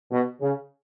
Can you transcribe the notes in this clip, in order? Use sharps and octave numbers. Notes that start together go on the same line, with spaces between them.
B2
C#3